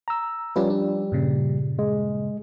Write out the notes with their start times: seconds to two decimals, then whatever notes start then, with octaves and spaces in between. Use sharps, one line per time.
0.08 A#5 E6
0.56 F3 G3 C#4 F4 G4 B4
0.70 D4
1.12 G2 A#2 C#3
1.79 G#3